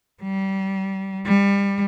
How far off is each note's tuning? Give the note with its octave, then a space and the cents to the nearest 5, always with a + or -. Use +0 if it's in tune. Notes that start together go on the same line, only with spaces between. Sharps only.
G3 -25
G3 +25